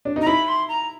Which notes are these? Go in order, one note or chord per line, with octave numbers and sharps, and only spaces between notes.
D4
D#4
A#5
E4 B5
C6
A#5